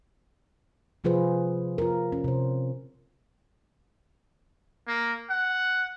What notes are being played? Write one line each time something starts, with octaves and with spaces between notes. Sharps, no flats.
C3 F3 F4 G#4 B4 C5
F4 A#4
C#4
C3 C5
A#3
F#5